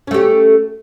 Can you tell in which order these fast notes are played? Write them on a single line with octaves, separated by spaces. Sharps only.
C#4 A3 G4